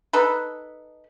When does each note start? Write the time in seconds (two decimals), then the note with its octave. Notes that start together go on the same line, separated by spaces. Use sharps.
0.13 D#4 A4 B4